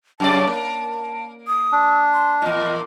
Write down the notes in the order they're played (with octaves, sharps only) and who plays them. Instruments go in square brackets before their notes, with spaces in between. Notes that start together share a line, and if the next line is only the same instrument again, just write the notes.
[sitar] F#2 C#3 D5 [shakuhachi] A5
[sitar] A#3
[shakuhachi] D#6
[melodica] D4
[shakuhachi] C6
[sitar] E2 A#2 [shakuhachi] D#5